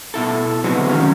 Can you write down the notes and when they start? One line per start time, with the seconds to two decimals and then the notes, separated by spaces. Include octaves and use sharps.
0.14 B2 E4 A4
0.64 D3 F#3 G#3 B3 C4
0.89 F2 D#3 F#3 C#4